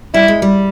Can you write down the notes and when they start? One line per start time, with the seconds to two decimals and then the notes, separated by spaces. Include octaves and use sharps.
0.14 G3 E4
0.28 G#3
0.42 G3